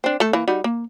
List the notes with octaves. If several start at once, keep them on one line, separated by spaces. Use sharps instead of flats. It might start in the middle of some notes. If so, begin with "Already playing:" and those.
C4 D4
A3 A4
E3 A#3
G3 D#4 F#4
A#3